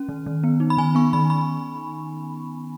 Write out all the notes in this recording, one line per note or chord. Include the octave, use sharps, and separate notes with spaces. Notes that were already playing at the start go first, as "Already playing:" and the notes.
Already playing: C#4
D#3
D#3
B3
D#4
B5
D#3 G#5
B3 C#6
D#3 B5
B5